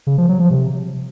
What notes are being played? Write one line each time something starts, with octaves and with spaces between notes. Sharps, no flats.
C#3
F3
F#3
F3
C3